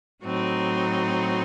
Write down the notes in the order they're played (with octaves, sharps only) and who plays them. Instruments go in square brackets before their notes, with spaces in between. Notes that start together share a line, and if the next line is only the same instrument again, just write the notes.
[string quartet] A2 F#3 C4 D#4